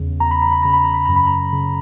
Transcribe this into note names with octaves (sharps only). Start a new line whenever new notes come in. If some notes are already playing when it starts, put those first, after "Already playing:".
Already playing: E2 C#3
E2 A#5
B5
A#5
B5
C#3 A#5
B5
A#5
B5
F#2 A#5
B5
A#5
C#3